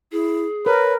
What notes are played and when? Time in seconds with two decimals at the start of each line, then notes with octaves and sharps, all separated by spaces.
0.12 E4 G#4
0.66 A#4 B4 C#5